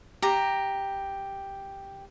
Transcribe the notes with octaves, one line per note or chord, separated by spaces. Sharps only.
G4 A#5